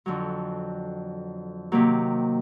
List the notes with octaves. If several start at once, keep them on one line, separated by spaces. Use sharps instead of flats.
F2 D3 F#3
C3 D#3 F#3 A#3